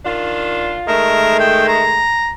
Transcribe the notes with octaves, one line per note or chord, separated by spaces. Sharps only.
D#3 D4 F4
D#3 G#3 A3 A#4
G5
A#5